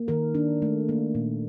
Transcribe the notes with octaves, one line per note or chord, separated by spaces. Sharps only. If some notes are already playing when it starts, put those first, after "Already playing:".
Already playing: A#3
D#3 A#4
D4
A3
A#3
A#2